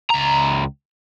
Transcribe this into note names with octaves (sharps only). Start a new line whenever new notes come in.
C#2 A#5